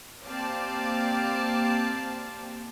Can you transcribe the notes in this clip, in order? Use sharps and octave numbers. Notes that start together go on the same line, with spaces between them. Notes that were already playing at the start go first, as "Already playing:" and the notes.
A#3 C4 G4 D5 F5 A5